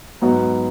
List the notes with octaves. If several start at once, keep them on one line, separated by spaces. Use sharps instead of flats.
G#2 F#3 B3 F#4